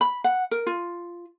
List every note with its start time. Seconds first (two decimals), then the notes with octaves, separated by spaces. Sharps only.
0.01 B5
0.24 F#5
0.51 A#4
0.67 F4